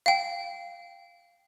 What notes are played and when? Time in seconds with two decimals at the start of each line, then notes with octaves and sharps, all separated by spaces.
0.06 F5 G5